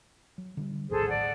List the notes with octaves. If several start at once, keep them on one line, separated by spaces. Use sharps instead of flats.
F#3
D3 F3 G3
A#1 D#2 A2 G#4 A4 C5
D5 F#5